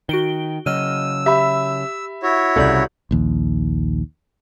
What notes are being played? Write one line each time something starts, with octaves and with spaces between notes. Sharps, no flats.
D#3 F#4 D7 G7
C#3 F#3 D#5 E6 F6 D#7
G4 E5 B5
E4 F#4 C#5
C2 C#3 A4 D5 G6
A#1 D#2